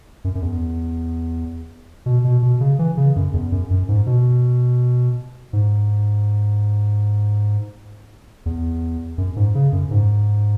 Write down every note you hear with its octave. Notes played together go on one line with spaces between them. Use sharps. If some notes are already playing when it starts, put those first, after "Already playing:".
F#2
F#2
E2
B2
B2
B2
C#3
E3
C#3
F#2
E2
F#2
F#2
G#2
B2
G#2
E2
F#2
G#2
C#3
F#2
G#2